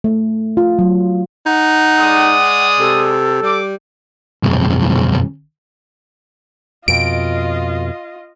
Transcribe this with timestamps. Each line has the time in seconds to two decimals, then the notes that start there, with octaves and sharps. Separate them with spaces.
0.04 A3
0.57 F4
0.79 F#3
1.46 D#4 F#5
1.97 G#3 D5 D#6
2.79 C3 A4
3.42 G3 D6
4.43 B1 F2
6.88 F2 B2 F4 D#5 D7